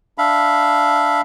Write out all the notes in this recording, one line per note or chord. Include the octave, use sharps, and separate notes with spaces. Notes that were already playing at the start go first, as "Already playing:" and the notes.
D4 E5 F5 B5